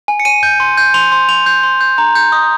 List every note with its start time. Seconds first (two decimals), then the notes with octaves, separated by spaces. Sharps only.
0.08 G#5
0.20 C#7
0.25 G#5 D#7
0.43 G6
0.60 C6
0.78 G6
0.94 C6 F7
1.12 C6
1.29 C6 F7
1.46 G6
1.63 C6
1.81 G6
1.98 A#5
2.15 G6
2.32 D#6